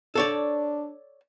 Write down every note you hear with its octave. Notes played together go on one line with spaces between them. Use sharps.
D4 A4 C#5 D5